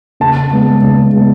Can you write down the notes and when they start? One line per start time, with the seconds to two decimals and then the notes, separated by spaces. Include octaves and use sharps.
0.20 C#3 A5
0.51 G#3 B3
0.83 C#3
1.13 G#3 B3